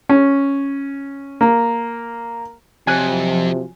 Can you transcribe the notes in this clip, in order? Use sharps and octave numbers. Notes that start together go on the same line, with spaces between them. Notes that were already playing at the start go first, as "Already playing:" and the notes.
C#4
A#3
F2 C3 F3 F#3 G#5 F#6